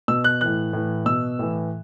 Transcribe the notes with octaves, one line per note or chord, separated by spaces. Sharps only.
B2 E6
F#6
A2 E3 F#6
A2 E3
B2 E6
A2 E3